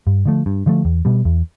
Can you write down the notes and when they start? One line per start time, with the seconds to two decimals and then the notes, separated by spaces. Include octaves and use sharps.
0.07 G2
0.25 D3 F3 A3
0.46 G2
0.66 D3 F3 A3
0.85 E2
1.05 B2 G3
1.25 E2